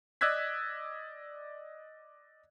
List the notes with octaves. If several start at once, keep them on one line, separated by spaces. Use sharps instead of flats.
D5 D#5 E6 F#6 G#6 B6